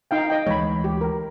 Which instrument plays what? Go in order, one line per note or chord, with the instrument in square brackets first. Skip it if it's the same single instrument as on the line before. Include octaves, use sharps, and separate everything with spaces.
[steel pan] D#4 F5 G5
D#5 G5
[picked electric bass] D2 E3 G#3 [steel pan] C#5 B5
[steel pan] G4
A#4